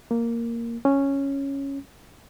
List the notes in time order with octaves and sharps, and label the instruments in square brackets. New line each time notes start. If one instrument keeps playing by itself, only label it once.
[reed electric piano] A#3
C#4